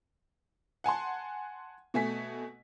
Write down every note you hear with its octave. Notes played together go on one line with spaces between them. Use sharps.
F#5 G#5 A5 C6
B2 A3 G#5 B6